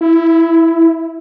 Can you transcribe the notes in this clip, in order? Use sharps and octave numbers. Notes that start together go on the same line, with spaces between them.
E4